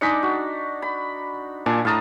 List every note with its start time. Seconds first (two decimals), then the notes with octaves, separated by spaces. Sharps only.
0.01 G#3 D4 D#4 D6 B6 C#7
0.23 F#4
0.82 B5
1.66 A#2 D4 G#5 A5
1.85 A2 F5 A5 A#5 D#6